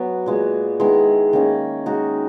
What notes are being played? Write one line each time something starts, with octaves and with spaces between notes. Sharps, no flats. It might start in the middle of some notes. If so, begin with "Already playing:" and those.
Already playing: F#3 B3 F#4
A#2 G#3 B3
D#3 G#3 B3 E4
D#3 A#3 C#4
G#3 D#4 F#4